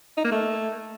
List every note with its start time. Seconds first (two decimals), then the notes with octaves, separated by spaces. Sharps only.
0.18 D#4
0.25 A#3
0.32 A3